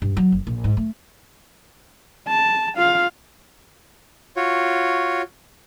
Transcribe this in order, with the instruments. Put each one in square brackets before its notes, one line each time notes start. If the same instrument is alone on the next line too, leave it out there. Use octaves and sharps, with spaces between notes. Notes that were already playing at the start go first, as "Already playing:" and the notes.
[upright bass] G2
F#3
F#1
A#1
G#2
A3
[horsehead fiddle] A5
F4 F5
[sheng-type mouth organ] F4 F#4 C#5